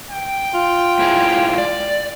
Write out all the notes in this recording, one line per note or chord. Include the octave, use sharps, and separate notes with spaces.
G5
F4
G#2 E4 G#4
D5